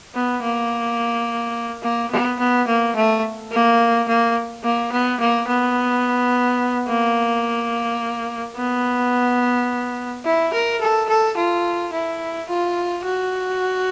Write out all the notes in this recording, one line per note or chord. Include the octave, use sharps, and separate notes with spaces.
B3
A#3
A#3
B3
B3
A#3
A3
A#3
A#3
A#3
B3
A#3
B3
A#3
B3
E4
A#4
A4
A4
F4
E4
F4
F#4